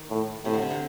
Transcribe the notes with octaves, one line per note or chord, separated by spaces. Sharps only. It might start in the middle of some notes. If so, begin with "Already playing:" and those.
Already playing: D#3
A2
A2 C3
D3
C3
D3